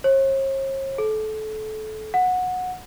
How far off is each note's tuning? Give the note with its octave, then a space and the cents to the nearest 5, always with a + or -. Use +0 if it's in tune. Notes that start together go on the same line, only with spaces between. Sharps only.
C#5 -45
A4 -25
F#5 -15